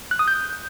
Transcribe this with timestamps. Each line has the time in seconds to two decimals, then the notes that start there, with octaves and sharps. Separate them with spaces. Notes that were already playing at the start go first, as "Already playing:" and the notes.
0.11 F#6
0.19 D#6
0.28 G6